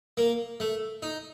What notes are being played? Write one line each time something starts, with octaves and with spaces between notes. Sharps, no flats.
A#3
A3
D#4